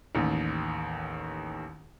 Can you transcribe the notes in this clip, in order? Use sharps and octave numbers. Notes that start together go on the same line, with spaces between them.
A1 D#2